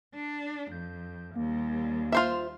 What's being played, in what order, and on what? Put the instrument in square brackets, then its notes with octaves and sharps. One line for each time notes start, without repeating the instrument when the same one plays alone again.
[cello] D4
[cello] F2 [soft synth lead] G6
[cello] D#2 G3 [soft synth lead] A#3
[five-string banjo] F4 C5 E5